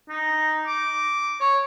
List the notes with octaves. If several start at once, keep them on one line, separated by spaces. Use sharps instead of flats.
D#4
D6
C#5